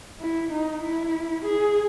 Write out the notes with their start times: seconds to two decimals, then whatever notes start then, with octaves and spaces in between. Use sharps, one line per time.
0.20 E4
0.52 D#4
0.83 E4
1.45 G#4